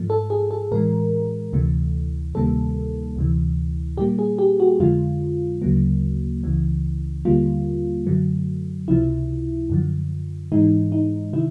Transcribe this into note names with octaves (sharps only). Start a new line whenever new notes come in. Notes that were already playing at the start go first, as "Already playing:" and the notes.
Already playing: G#2 F3 A3
A4
G#4
A4
A2 E3 G#3 A#4
D2 C3 E3 A3
D2 C3 D#3 G3 A#3 A4
D2 C3 E3
A#2 G3 A#3 G4
G#4
G4
F#4
F2 D3 F3 G#3 F4
D2 C#3 F#3 A#3
C#2 C#3 E3
D#2 D3 G3 A#3 F4
F#2 D3 F#3 A3
C#2 C3 F3 E4
F#2 D3 F3
G#2 E3 G#3 D#4
D#4
C3 D#3 E4